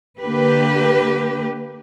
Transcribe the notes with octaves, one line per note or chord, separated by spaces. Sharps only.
D3 A#3 G4 B4